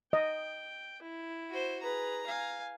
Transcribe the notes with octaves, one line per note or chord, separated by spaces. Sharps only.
D#5 G5
E4
F#4 C5
G#4 B4 A#5
F5 G#5